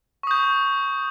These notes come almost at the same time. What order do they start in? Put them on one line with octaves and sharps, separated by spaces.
C#6 D#6 G6